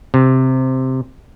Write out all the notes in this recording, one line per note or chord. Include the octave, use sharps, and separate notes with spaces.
C3